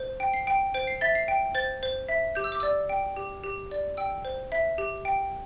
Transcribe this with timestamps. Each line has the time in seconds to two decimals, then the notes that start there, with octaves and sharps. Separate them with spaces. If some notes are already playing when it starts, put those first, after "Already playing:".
Already playing: C5
0.20 G5
0.34 C7
0.47 G5
0.74 C5 D7
0.87 C7
1.01 E5 A6
1.15 C7
1.28 G5
1.55 C5 A6
1.83 C5
2.08 E5
2.35 G4 G6
2.44 E6
2.52 D6
2.60 D5 E6
2.89 G5
3.16 G4
3.44 G4
3.71 D5
3.97 G5 E6
4.25 C5
4.52 E5
4.78 G4
5.05 G5